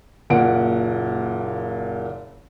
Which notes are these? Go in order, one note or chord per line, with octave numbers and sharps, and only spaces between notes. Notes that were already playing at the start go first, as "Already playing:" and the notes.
F#1 A#2 A#4 F#5 D7